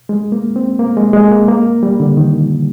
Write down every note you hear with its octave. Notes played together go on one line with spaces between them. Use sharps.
G#3
A#3
C4
A#3
G#3
G#3
A#3
A#3
G3
D3
D#3